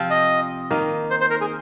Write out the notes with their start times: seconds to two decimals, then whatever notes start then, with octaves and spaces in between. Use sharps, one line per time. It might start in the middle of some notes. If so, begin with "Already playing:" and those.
Already playing: C3 F3 C4 F4
0.10 D#5
0.71 D#3 A#3 D#4
1.11 C5
1.21 C5
1.30 A#4
1.41 G#4